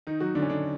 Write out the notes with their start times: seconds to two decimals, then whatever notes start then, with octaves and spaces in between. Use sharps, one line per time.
0.07 D#3 D#4
0.20 F#3 F#4
0.35 D3 D4
0.42 C#4
0.49 D3 D4